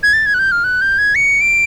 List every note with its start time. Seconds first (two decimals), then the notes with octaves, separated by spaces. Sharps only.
0.03 G#6
0.13 A6
0.26 G#6
0.34 F#6
0.39 G6
0.52 F6
0.64 F#6
0.81 G6
0.98 G#6
1.15 C#7
1.41 D7